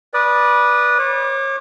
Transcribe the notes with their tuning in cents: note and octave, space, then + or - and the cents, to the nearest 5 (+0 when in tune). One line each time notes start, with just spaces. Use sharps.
B4 -20 D5 +0 D#6 -15
C#5 -35 D6 +15